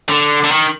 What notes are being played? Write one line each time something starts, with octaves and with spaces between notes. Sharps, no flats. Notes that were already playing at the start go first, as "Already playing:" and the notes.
D3
D3
D#3